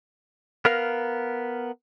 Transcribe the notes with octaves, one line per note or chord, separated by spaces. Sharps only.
B3 A#4 F5